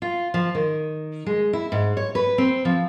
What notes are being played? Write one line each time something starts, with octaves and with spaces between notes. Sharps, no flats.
F4
F3
D#3
G#3
E4
G#2
C#5
B4
C4
F3